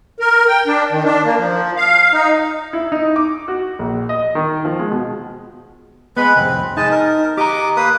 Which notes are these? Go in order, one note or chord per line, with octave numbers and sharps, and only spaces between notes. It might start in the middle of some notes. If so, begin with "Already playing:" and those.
A#4
G5
D4
D#3
D4
A#3
F3
F5
D#4
E4
D#4
D6
F#4
A#1
D#5
D#3
F3
G#3
B2
G#3 B3 B4 B5
C2 F2 C4
G#3 D#4 D#5 A5
A#4
G4 D#5 A#5 D6
A#3 B4 D#6